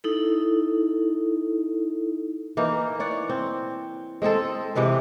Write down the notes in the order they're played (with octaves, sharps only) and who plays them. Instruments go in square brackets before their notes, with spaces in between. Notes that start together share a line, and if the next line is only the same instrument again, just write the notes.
[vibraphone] D#4 E4 A4
[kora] E3 A#3 D#4
C#5 D5 F#5
C4
G#3 C4 G#4 A4
C3 E3 G#3 B4